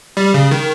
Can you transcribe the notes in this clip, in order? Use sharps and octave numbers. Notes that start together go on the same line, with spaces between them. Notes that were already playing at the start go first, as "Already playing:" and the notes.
G3
C#3
D#3